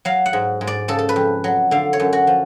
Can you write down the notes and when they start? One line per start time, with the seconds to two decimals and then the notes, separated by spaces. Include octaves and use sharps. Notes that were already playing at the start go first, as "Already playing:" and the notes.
0.05 F#3 F5
0.26 F#5
0.33 G#2
0.61 G#2
0.67 D5
0.88 C#3 A4
0.99 A4
1.09 B4
1.16 F2
1.44 F#3
1.71 D3 F5
1.93 C#5
2.00 F#2
2.13 F#4
2.27 F3